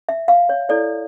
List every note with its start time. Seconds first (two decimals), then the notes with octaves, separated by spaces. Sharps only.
0.09 E5
0.28 F5
0.49 C#5
0.69 E4 A4 C#5 D5